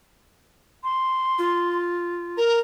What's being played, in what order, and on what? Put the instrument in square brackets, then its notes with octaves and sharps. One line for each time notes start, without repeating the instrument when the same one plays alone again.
[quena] C6
[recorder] F4
[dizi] A#4 [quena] A#5